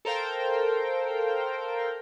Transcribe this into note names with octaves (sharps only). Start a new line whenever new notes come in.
A4 A#4 C5 F5 G5